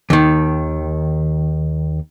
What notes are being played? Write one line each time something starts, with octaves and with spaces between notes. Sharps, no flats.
D#2 D#3